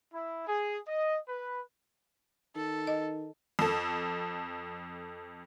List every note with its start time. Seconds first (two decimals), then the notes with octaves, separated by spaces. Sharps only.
0.13 E4
0.47 G#4
0.87 D#5
1.28 B4
2.56 D#3 A4
2.87 D#5
3.59 F2 A4